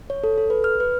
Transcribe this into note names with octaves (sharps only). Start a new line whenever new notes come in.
C#5
A4
A4
B4
F6
B4